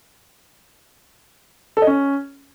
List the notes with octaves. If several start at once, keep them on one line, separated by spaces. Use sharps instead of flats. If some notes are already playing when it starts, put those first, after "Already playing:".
A4
D#5
C#4